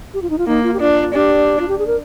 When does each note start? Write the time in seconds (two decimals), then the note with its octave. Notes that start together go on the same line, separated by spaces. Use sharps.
0.14 G4
0.22 F4
0.30 D#4
0.38 F4
0.47 A#3 D#4
0.63 F4
0.74 G4
0.80 D4 F4
1.14 D4 G4
1.59 F4
1.68 G4
1.79 G#4
1.87 A#4